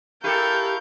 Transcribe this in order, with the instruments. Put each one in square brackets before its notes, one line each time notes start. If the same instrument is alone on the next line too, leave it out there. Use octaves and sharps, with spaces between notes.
[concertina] E4 F5 C#6 [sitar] G4 A4 [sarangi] A#4 [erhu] G6